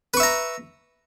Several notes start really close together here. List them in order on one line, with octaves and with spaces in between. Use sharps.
B4 C#6 E5 A#5